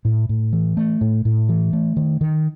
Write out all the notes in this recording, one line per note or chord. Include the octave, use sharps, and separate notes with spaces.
A2
A2
E3
A3
A2
A2
E3
A3
D#3
D#3